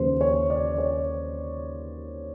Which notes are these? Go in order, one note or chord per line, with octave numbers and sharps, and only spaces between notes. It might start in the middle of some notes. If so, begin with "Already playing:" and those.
Already playing: D#2 C#3 F3 A#3 B4 C5
C#5
D5
C#5